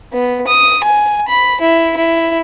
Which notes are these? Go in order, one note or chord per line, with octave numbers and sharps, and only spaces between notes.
B3
D#6
G#5
B5
E4
E4